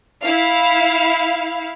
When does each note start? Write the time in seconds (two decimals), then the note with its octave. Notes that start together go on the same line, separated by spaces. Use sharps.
0.22 E4 F5